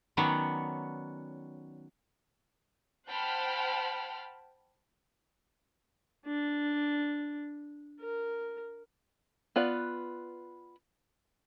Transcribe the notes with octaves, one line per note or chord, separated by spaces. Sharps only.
D#3 F#3 B3 C#4 C#5 D5
C5 F#5 G5 A5 B5 F6
D4
A#4
B3 F4 B4 D5